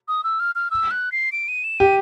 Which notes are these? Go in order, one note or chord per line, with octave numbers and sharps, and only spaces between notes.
D#6
E6
F6
F6
E6
F#6
C7
D7
D#7
E7
G4 D#7